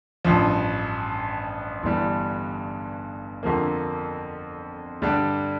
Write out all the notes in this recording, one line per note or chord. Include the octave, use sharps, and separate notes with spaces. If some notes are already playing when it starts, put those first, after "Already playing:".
A1 G2 F3
G1 G2 E3 G3 D4
F2 D3 F3 A#3
G2 D3 G3 D4